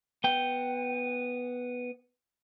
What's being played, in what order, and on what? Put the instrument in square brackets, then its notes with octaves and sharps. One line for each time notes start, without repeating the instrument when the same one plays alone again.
[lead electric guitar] B3 G5